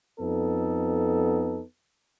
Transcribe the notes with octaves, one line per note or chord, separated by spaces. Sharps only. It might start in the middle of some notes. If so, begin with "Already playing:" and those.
F2 B3 D#4 A4